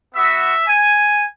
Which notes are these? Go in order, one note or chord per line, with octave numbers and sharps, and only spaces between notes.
B3 F#4 E5
G#5